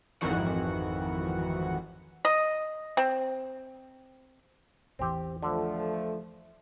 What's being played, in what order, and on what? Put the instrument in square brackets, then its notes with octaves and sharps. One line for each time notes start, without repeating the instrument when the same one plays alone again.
[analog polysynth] G#1 F2 D#3 E3 F#4 F#5
[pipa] D#5
C4
[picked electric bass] A1 E2 E3 [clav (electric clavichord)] C4 G4
[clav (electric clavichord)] D3 [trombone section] F3 A3